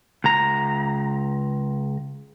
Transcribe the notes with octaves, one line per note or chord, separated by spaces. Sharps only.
C#2 A#5